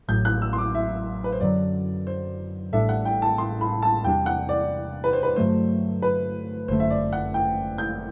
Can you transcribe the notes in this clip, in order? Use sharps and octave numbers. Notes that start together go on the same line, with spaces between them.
A1 A2 F#3 G6
F#6
E6
C6
D6
E5
B4
C5
F#2 D3 F#3 D5
C5
A1 A2 G3 D4 A4 E5
F#5
G5
A5
C6
B5
A5
E2 C3 G3 D4 G5
F#5
D5
B4
C5
B4
G2 D3 F#3 A3 C5
B4
G1 F#2 D3 A3 C5
E5
D5
F#5
G5
G6